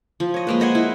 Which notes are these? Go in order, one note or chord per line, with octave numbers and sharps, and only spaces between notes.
F3
C#5 D#5
G#3 A#3 B4
C5 D#5 F#5 G#5
E4